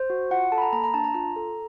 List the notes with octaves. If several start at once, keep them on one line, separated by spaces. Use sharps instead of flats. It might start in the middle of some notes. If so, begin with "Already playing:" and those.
Already playing: C5
F#4
F4 F#5
A4 A5
B5
A#5
A#3 A#5
A#5
D4 A5
A#5
F4 A#5
A4